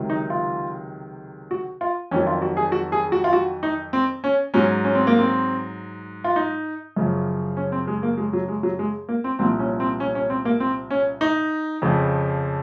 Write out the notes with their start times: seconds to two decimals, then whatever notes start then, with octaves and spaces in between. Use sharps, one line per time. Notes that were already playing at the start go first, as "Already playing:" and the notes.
Already playing: C#2 C3 D#3 F#3
0.10 D#4
0.30 F4
1.51 F#4
1.81 F4
2.11 F2 D#3 F#3 C#4
2.27 F4
2.42 F#4
2.57 G#4
2.72 F#4
2.92 G#4
3.12 F#4
3.24 F4
3.33 F#4
3.63 D#4
3.93 C4
4.24 C#4
4.54 G#2 F#3 C#4
4.84 C#4
4.95 C4
5.07 A#3
5.18 C4
6.24 F4
6.36 D#4
6.96 F#2 C#3 F3
7.57 C#4
7.72 C4
7.87 G#3
8.03 A#3
8.18 G#3
8.33 F#3
8.48 G#3
8.63 F#3
8.79 G#3
9.09 A#3
9.24 C4
9.39 C2 A#2 F3 C4
9.59 C#4
9.80 C4
10.00 C#4
10.15 C#4
10.30 C4
10.45 A#3
10.60 C4
10.91 C#4
11.21 D#4
11.82 F2 C#3 F3